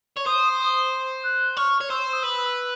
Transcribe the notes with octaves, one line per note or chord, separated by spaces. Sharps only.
C#5
C5 D#6
D#6
F#6
C#5 F6
C#5
C5 E6
D#6
B4 E6
E6